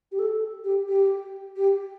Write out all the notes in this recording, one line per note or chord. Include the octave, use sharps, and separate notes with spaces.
G4
A4
G4
G4
G4